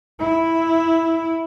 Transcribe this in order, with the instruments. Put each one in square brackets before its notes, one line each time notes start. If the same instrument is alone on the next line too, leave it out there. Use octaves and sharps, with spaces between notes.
[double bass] E4